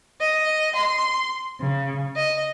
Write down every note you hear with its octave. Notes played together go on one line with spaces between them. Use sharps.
D#5
C6
C#3
D#5